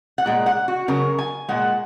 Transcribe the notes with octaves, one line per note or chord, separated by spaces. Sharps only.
F#5
A#2 G#3
F#5
F#4
C#3 F#3 A#4
G#5
A#2 G#3 F#5